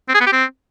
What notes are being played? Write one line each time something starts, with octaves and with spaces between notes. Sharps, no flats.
C4
G#4
B3
G4
C4